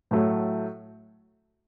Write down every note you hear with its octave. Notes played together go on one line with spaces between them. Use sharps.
A2 F#3 A3